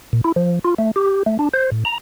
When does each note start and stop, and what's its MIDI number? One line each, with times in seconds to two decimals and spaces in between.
0.13 0.21 46
0.24 0.32 64
0.36 0.59 53
0.65 0.74 65
0.78 0.91 57
0.96 1.23 67
1.26 1.37 57
1.39 1.49 62
1.53 1.70 72
1.72 1.84 45
1.85 1.98 82